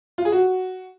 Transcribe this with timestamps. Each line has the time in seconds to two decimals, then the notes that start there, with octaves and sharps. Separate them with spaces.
0.18 F4
0.25 G#4
0.32 F#4